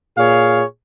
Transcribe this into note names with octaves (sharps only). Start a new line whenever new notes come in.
A#2 G#4 C#5 F5